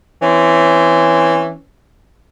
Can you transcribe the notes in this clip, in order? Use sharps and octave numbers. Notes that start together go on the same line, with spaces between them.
E3 C4 C#4